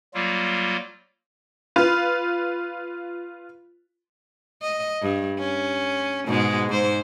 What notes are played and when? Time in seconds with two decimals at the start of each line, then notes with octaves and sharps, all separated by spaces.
0.14 F#3 G3 A#3 F4
1.76 F4 B4
4.62 D#5
5.02 G2
5.39 C#4
6.26 G#2 B2 G#3
6.69 G#2 C5